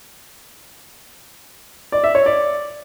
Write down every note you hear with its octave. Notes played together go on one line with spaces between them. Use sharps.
D5
E5
C#5
D5